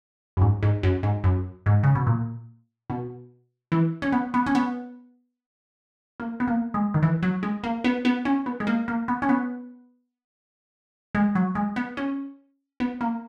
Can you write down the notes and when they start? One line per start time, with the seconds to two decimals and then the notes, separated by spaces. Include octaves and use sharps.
0.37 F#2
0.41 G#2
0.63 G#2
0.83 F#2
1.03 G#2
1.24 F#2
1.66 G#2
1.83 C#3
1.95 B2
2.07 A#2
2.90 B2
3.72 E3
4.02 C#4
4.12 B3
4.34 B3
4.46 C#4
4.55 B3
6.20 A#3
6.40 B3
6.47 A#3
6.74 G#3
6.94 D#3
7.02 E3
7.23 F#3
7.43 G#3
7.63 A#3
7.84 B3
8.05 B3
8.25 C#4
8.46 B3
8.60 G#3
8.67 A#3
8.88 A#3
9.08 B3
9.22 C#4
9.29 B3
11.15 G#3
11.35 F#3
11.55 G#3
11.76 B3
11.97 C#4
12.80 B3
13.01 A#3